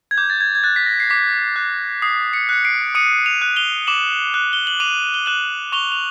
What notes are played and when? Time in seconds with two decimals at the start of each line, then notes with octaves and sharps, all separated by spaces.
0.11 G#6
0.18 D6 G6
0.30 A6
0.41 G#6
0.55 G#6
0.63 F#6 A6
0.76 B6
0.86 A#6
1.00 C7
1.10 D6 B6
1.56 F#6
2.02 D#6 C7
2.33 B6 C#7
2.49 F#6 C#7
2.65 C7 D7
2.95 D#6 C#7 D#7
3.26 D#7 F7
3.42 F#6
3.56 F7 G7
3.87 D6 E7 F#7
4.34 F#6
4.53 G7
4.67 F#7
4.80 D6 D#7 F7
5.14 G7
5.26 F#6 E7 F#7
5.72 C#6 F7 G7
5.92 F7